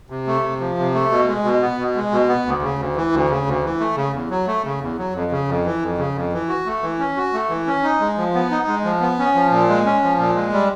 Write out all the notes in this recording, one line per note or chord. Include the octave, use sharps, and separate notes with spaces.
C3
A3
C3
F3
C3
A3
B2
G#3
B2
B3
B2
G#3
B2
B3
D2
C#3
D2
E3
D2
C#3
D2
E3
A3
C#3
E2
F#3
A3
C#3
E2
F#3
F2
C#3
F2
E3
F2
C#3
F2
E3
F#4
A3
E3
C#4
F#4
A3
E3
C#4
D#4
G#3
F3
B3
D#4
G#3
F3
B3
C#4
F3
A#2
G#3
C#4
F3
A#2
G#3
G3